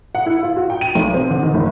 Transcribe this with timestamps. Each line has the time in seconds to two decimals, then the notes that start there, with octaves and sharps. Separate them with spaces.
0.15 F#5
0.26 E4
0.43 F4
0.57 F#4
0.70 G5
0.81 D#7
0.95 B1
1.14 C4
1.30 D3
1.43 D#3
1.54 F#1